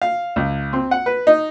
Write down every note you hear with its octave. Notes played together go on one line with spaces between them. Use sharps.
F5
C#2
C4
F#5
B4
D#4